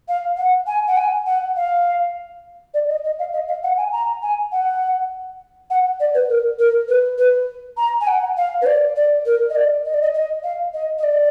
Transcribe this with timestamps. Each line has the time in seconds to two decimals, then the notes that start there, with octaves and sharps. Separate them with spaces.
0.08 F5
0.37 F#5
0.67 G#5
0.88 F#5
0.97 G#5
1.26 F#5
1.56 F5
2.74 D5
2.89 D#5
3.04 D#5
3.19 F5
3.33 D#5
3.48 F5
3.63 F#5
3.77 G#5
3.92 A#5
4.23 G#5
4.52 F#5
5.70 F#5
6.00 D5
6.14 B4
6.29 A#4
6.59 A#4
6.88 B4
7.18 B4
7.77 A#5
8.01 G#5
8.07 F#5
8.37 F5
8.62 B4
8.66 D5
8.96 D5
9.26 A#4
9.50 D#5
9.55 D5
9.85 D#5
9.94 D5
10.02 D#5
10.14 D#5
10.43 F5
10.74 D#5
10.98 D#5
11.03 D5